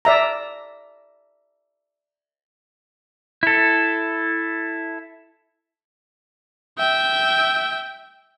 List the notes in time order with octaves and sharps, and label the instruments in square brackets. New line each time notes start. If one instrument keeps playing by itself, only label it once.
[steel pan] D5 E5 A#5
[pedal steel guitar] E4 A4
[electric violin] E5 G5